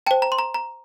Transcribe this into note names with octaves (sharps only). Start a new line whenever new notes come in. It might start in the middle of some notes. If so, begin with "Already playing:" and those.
C5 G5 A5
A#5
C6
A#5
A#5